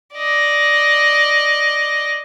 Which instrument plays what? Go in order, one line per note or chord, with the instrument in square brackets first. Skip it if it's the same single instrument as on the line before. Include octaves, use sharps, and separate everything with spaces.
[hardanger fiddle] D5 D#5